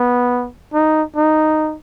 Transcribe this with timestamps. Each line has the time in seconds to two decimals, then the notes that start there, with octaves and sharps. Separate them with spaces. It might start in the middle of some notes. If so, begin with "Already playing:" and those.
Already playing: B3
0.74 D#4
1.16 D#4